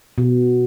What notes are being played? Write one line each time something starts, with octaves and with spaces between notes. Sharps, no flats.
B2